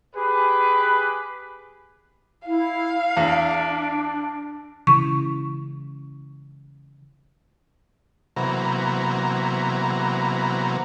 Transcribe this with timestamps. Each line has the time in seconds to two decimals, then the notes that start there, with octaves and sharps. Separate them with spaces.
0.15 G4 G#4 B4
2.48 E4 F5
3.17 E2 D4
4.87 C#3 E3 C#6
8.36 C3 E3 F#3 A#3 B3 A#4